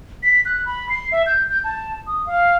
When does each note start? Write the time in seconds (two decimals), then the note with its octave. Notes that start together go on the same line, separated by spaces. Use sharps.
0.23 B6
0.45 F#6
0.66 B5
0.90 C7
1.12 E5
1.26 G6
1.50 G6
1.64 A5
2.07 D#6
2.27 F5